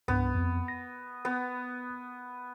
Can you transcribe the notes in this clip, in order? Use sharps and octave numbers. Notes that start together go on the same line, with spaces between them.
C2 G2 B3
F2
A#6
B3